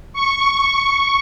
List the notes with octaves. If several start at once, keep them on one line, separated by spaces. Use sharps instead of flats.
C#6